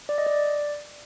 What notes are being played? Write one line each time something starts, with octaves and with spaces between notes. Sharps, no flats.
D5
D#5
D5